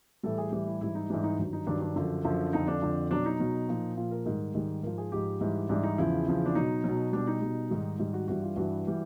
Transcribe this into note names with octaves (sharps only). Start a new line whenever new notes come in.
A2 E3 G3 A4
G#4
A2 E3 G3 G4
E4
G#2 E3 G3 E4
D#4
G#2 E3 G3 D4
D#4
G2 D#3 F#3
D#4
G2 D#3 F#3 D4
D4
F#2 D3 F3
F#2 D3 F3
F2 D3 F3 D#4
D4
F2 D3 F3
B2 F#3 D4
D#4
B2 F#3
A#2 F3
A#2 F3 F4
A#4
G#2 D#3 G3 A#4
G#2 D#3 G3
G#2 F3 A#4
G#4
G#2 F3 G4
G#2 E3 G3
G#2 E3 G3 D4
D#4
E2 C#3 F3 E4
E2 C#3 F3
D4
B2 F#3 D#4
B2 F#3
B2 G3 D4
D#4
B2 G3
G#2 D#3 G3
G#2 D#3 G3
F#4
G2 E3 G3 F#4
F4
G2 E3 G3 F#4
E3 G3